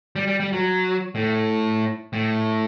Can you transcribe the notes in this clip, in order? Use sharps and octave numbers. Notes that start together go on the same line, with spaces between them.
G3
G3
G3
F#3
A2
A2